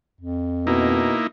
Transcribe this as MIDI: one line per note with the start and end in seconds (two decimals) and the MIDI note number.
0.21 1.10 41
0.67 1.18 47
0.67 1.27 58
0.67 1.27 63
0.67 1.27 64